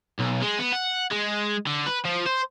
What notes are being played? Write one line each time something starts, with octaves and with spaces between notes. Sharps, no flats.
B1
G#3
B3
F#5
G#3
D3
B4
F3
C5